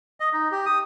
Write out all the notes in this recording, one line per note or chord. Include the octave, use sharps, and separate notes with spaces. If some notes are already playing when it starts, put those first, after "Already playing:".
D#5
D#4
G4
D#6